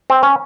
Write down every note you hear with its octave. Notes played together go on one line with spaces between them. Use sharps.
C4
C#4